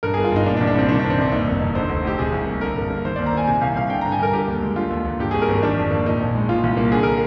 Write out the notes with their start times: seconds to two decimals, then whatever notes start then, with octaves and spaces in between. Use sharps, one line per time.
0.03 G2 A#4
0.14 G1 G#4
0.24 F4
0.32 G1 D#4
0.46 A#2 D4
0.57 D4
0.61 C2
0.67 D4
0.75 C2 C4
0.89 D#3 D4
0.99 G2 D4
1.10 C4
1.18 G2 D4
1.32 D#2 D#4
1.47 F1
1.61 F1
1.75 D3 C5
1.89 D2
2.05 D2 G4
2.18 C3 G#4
2.32 C2
2.46 A#3
2.61 D3 A#4
2.76 G2
2.90 A#3
3.05 D#3 C5
3.16 D#2 D5
3.26 A#5
3.33 A#3 G#5
3.47 C3 G#5
3.61 C2 F5
3.76 C2 F5
3.90 D3 G5
4.01 G2 A#5
4.12 G#5
4.19 G2 A#4
4.33 D3 G4
4.48 D#2
4.62 G#3
4.76 D3 F4
4.90 D#2
5.05 D#2
5.19 G2 G4
5.31 G#1 G#4
5.42 A#4
5.49 G#1
5.62 D#3 D4
5.77 F2
5.91 A#3
6.05 A#2 D#4
6.20 A#1
6.35 G#3
6.49 A#2 F4
6.63 C2
6.77 A#3
6.92 D3 G#4
7.03 A#4